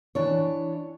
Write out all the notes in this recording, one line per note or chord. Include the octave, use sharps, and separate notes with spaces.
E3 D4 C#5